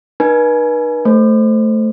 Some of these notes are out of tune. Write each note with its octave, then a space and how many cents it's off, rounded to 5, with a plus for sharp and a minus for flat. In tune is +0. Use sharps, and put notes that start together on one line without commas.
D#4 -35 B4 -40 G#5 +25
A3 +0 C5 +0